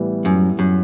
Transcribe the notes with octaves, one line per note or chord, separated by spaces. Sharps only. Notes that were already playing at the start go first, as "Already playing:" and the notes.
Already playing: A2 E3 G3 B3 E4
F#2
F#2